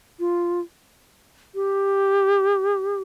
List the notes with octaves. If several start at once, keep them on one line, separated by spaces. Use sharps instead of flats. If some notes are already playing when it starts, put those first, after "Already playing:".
F4
G4